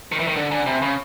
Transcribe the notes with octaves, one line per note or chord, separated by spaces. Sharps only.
D#3
E3
D#3
D3
D3 G#5 A#5
C3 A5 B5
C#3 B5 C#6